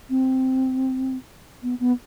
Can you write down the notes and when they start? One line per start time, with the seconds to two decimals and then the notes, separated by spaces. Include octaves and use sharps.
0.10 C4
1.63 B3
1.80 B3